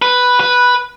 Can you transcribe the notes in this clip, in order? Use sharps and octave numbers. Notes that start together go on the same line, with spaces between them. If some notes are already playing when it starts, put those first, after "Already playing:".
B4
B4